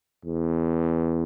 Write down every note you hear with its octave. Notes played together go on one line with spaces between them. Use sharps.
E2